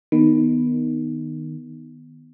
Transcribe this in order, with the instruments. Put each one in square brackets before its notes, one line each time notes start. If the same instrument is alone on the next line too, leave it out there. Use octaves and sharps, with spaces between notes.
[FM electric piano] D#3 [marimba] B3